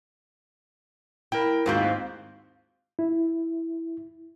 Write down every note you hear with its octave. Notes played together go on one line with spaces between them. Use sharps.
E4 A#4 G5
D#2 G#2 C4 F4 F#4 G6
E4